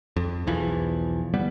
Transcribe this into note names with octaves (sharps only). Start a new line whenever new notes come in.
F2
B1 E2 E3 F3
G1 G3 B3